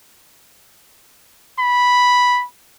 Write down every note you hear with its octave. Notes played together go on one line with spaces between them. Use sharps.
B5